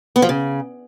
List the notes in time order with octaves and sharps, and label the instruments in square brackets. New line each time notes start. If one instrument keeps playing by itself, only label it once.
[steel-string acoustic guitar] B3
F3
C#3